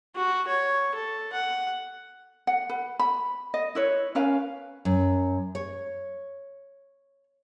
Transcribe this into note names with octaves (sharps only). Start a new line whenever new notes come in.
F#4
C#5
A4
F#5
F#5
B4
B5
D#5
E4 B4 C#5
C#4 A#4 B4 F5
F#2
C#5